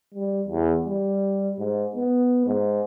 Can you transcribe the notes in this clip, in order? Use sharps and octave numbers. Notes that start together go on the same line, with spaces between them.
G3
E2
G3
G#2
B3
G#2